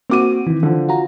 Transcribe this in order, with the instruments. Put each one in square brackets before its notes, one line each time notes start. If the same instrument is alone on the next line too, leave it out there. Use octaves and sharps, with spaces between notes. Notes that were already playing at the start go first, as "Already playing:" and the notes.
[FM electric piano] A#3 F#4 [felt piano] C4 D6 D#7
[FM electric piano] D#3 E3
[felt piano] D3 F3
[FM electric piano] F4 F#4 A#5